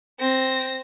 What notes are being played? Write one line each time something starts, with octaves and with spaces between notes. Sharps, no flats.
C4 A#6